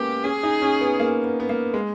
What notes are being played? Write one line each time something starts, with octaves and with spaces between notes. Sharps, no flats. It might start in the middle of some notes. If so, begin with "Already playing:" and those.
Already playing: G#3 A#3 B3 C#4 G4
C#4 G#4
D#4
C#4
B3
A#3
B3
B3
A#3
G#3